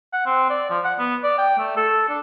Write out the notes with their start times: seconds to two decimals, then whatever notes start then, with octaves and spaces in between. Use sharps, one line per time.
0.13 F#5
0.26 C4
0.50 D5
0.70 F3
0.84 F#5
0.99 B3
1.23 D5
1.38 G5
1.58 A3
1.77 A4
2.09 D4